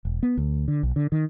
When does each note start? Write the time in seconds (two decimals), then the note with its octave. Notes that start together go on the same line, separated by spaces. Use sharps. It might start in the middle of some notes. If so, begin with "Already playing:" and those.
0.05 E1
0.23 B3
0.37 D2
0.68 D3
0.83 B1
0.96 D3
1.12 D#3